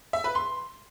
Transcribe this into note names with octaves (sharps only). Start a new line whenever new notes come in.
E5
B4
C6